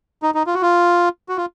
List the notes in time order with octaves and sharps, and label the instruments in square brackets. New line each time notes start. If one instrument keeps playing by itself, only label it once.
[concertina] D#4
D#4
F4
F#4
F4
F#4
F4